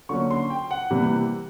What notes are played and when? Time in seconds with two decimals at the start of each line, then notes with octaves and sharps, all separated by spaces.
0.09 D3 F#3 A#3 C#4 C#6
0.31 C6
0.50 G5
0.71 F#5
0.91 C3 E3 G3 A#3